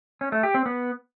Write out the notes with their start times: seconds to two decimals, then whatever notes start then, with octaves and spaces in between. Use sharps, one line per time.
0.21 C#4
0.32 A3
0.43 G4
0.54 C4
0.66 B3